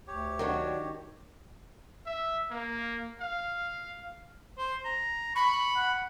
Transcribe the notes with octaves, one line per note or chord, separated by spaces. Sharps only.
D2 G4 C#5
D#3 F#3 D4 F#4
E5
A#3
F5
C5
A#5
B5 C#6
F#5